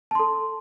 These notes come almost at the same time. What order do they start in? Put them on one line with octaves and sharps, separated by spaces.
A5 C6 A4